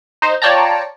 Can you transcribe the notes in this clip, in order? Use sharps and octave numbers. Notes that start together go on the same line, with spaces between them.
D#4 C5
F4 C#5 D5 G5 A5 A#5